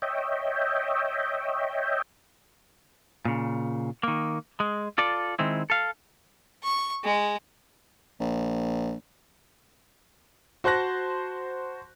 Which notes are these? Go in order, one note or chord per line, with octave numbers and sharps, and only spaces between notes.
C#5 D#5 E5 G5
A#2 C#3
D#3 A#3
G#3
F4 A4 D5
D#3 G#3 C4 E4
A4 F5
C#6
G#3
A#1
F#4 C5 A5 F#6 A#6